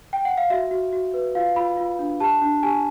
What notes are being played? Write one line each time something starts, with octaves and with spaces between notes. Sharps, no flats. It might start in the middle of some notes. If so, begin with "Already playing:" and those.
G5
F#5
F5
F#4 E5
F#4
F#4
B4
F4 F5
F4 B5
F4
D4
G4 A5
D4
G4 G#5